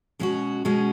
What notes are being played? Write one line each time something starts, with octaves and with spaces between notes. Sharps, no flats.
B2 G#3 C#4 F#4
B2 G#3 C#4 F#4